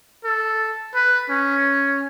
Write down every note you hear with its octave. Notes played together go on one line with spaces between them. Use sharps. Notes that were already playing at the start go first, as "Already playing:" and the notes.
A4
B4
C#4